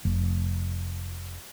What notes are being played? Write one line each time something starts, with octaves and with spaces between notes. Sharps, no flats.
F1